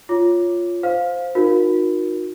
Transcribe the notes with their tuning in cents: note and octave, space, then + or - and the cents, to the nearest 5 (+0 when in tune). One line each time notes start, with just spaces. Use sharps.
F4 +0 C#5 +0 D6 +0
C5 +0 F5 +10
D#4 +0 F#4 -35 A#4 +20